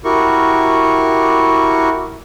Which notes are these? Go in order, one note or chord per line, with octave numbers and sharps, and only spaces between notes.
E4 F#4 G4 A#4 C#6